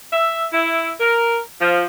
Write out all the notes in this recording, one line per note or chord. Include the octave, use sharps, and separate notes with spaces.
E5
E4
A#4
F3